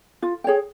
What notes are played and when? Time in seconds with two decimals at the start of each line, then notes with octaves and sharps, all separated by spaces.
0.22 F4
0.44 G#4 C#5 G5